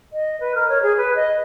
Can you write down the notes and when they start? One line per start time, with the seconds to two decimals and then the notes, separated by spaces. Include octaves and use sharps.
0.12 D#5
0.40 B4
0.55 A#4
0.68 C#5
0.82 G#4
0.96 B4
1.15 D#5